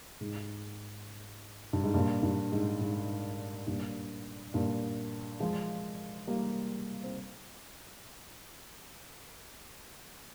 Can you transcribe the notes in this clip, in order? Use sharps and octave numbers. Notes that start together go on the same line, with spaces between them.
G#2
G2
G#2
G2 A#2
G2
G#2
G#2
G2 A#2
G2 A#2
F3 G#3
G3 A#3
C4